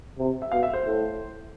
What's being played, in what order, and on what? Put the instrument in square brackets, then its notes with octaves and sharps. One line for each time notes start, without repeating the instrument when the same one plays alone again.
[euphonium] C3
[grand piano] E5
[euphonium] B2 [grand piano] F5
[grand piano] E5
C5
[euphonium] A2